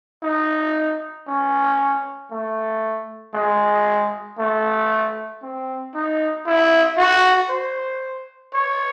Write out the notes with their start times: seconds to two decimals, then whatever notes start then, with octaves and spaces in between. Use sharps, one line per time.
0.23 D#4
1.27 C#4
2.31 A3
3.34 G#3
4.38 A3
5.42 C4
5.94 D#4
6.46 E4
6.97 F#4
7.49 C5
8.53 C#5